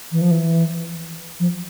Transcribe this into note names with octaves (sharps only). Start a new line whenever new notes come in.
E3
F3
E3
F3